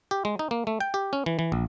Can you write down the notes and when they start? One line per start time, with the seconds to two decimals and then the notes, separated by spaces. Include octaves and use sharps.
0.11 G4
0.25 G#3
0.39 D#4
0.51 A#3
0.67 A3
0.80 G5
0.94 G4
1.13 C#4
1.26 E3
1.39 E3
1.52 A#1